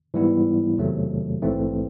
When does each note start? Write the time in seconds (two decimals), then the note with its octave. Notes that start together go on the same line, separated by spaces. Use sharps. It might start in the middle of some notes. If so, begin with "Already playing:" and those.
0.14 G#2 E3 G3 B3 E4
0.78 E2 C3 D#3 F#3 A3
1.42 A#1 G#2 E3 A3 C4